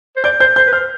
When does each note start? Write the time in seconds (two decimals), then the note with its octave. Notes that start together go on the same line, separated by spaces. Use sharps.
0.16 C5
0.24 D5 G6
0.40 C5 G6
0.56 C5 G6
0.67 B4
0.73 C5 F6